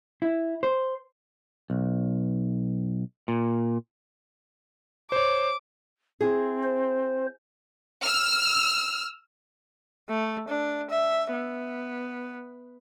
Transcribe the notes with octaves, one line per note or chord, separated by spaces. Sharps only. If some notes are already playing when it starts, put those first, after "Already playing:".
E4
C5
B1
A#2
C5 C#5 D6
C4 E4 G#4
C5
E6 F6
A3
D4
E5
B3